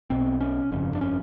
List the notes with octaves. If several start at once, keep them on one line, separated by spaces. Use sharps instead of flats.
B1 B2 C4
C#4
G1 F2 C#3
D4
C#4